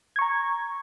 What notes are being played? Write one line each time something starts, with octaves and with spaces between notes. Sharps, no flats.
A#5 C#6 G#6